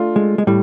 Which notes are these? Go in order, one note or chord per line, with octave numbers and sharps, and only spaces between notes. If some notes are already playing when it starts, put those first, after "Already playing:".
Already playing: A3 D4 F4
G#3
G#3
A2 G3